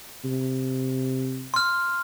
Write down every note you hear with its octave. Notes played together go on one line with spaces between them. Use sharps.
C3
C6 F6